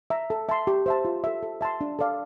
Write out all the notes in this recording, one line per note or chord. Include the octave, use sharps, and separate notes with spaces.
E5 A#5
A4
E5 A5 C6
G4
C5 E5 A5
F4
A4 E5
A4
E5 A5 C6
D4
A4 D5 F5